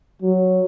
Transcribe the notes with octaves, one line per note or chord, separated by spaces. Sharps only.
F#3